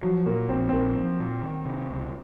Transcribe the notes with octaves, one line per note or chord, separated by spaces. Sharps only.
F3 F#3
A#2 A#3
A#1 C4
C4
A#1 A#3
F3
A#2
D#3
C3
C#2